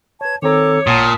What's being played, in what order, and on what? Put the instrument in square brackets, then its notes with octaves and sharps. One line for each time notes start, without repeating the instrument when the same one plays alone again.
[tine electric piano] B4 C#5 [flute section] A5 G#6
[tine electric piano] D#3 C4 A#5 [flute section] A4 D6 [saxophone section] C#5
[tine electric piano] A1 F#5 A6 [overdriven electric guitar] A#2 [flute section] A5 D#6